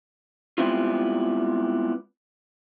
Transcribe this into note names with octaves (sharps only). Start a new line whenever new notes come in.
G3 G#3 B3 C4 E4 F4